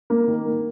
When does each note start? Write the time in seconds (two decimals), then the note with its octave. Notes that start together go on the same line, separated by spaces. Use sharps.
0.10 A#3
0.27 D#3
0.45 A#3